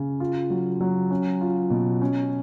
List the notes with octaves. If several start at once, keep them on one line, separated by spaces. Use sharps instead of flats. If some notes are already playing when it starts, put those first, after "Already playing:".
Already playing: C#3
F4
F#3
F#3
C#4
F4
B2
C#4